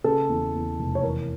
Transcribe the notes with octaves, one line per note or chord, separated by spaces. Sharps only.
C#3 A4
E2
E2
F1
C#5
E3 A#4